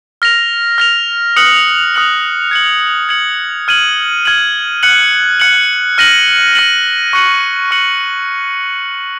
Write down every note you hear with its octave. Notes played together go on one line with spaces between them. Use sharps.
F6 A#6 F7
F6 A#6 F7
D#6 F#6 C#7 F#7
D#6 F#6 C#7 F#7
G#6 C#7 F#7
G#6 C#7 F#7
F6 G#6 D#7 F#7
F6 G#6 D#7 F#7
F#6 C#7 F#7
F#6 C#7 F#7
F6 A#6 D#7 F#7
F6 A#6 D#7 F#7
C#6 F#6 C#7 F#7
C#6 F#6 C#7 F#7